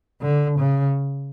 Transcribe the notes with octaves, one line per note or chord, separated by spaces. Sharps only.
D3
C#3